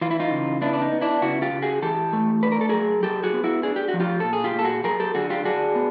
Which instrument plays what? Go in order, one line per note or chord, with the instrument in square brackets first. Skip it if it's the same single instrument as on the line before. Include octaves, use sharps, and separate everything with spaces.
[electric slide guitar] E3 F4
E4
D#4 F4
C#3
B3 D4 E4
D4
D#4
B3
D4 E4
C#3 E4 F#4
F4 G4
C#3
F#4 G#4
E3 G4 A4
A3
D4 B4
A#4
A4
F#3 G#4 A#4
F#3 G4 A4
F#4 G#4
B3
E4 F#4
D4 G#4
G4
F#4
F3
F4 G4
A#2 A4
G#4
F4 G4
A#2 A4
F#4 G#4
F#3 G#4 A#4
G4 A4
D3 F#4 G#4
F4 G4
D4 F#4 G#4
B3